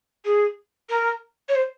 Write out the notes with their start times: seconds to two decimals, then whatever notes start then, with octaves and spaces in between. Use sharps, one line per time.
0.24 G#4
0.89 A#4
1.48 C#5
1.55 C5